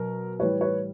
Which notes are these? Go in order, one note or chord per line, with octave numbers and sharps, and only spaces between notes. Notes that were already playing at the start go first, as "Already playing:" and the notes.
Already playing: B2 F#3 A#4
A2 E3 G3 B4 C#5
B4 C#5